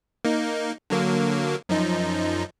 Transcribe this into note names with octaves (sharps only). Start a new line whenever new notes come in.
A#3 D#4
D3 F#3 A#3
F#2 F3 D#4